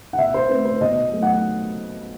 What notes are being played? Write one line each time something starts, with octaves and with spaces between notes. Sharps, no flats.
F#5
B2 E5
C5
A3 C4 B4
C5
B2 D#5
F#3 A3
F#5